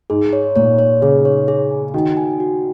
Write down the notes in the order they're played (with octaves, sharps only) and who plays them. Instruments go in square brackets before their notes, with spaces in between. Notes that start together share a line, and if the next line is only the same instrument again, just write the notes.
[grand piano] G#2 [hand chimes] G#4
[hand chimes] C#5
[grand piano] A#2 [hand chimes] C#5
[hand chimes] C#5
[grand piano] C#3 [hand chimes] G#4
[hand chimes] C#5
G#4
G#5
[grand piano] D#3 [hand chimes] F#4
[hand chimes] G#5
F#4